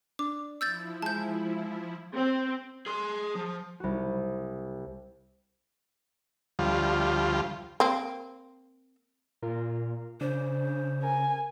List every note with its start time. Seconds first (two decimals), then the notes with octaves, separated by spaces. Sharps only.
0.19 D4 D6
0.61 F3 E4 E6 G6 A6
1.02 G#3 A5 G6
2.15 C4
2.86 G#4 C6
3.35 F3
3.80 C2 F#4
6.59 D2 F3 G3 F4
7.80 A#3 C4
9.42 A#2 F4 A#4
10.21 C#3 D4 C5
11.03 A#4 G#5